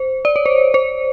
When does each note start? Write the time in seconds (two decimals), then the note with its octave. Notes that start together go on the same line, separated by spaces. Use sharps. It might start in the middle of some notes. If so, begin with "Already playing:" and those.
Already playing: C5
0.25 D5
0.36 C#5
0.46 C5
0.74 C5